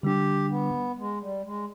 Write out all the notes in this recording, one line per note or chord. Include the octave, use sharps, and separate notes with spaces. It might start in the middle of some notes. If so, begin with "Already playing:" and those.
D3 G3 D4 G4
B3
G#3
G3
G#3